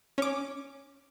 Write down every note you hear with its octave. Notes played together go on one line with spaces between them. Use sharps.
C#4 D6